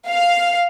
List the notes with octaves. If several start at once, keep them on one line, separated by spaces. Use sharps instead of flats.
F5